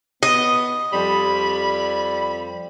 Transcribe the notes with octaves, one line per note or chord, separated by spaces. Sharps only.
B3 D#5
F2 G3 B5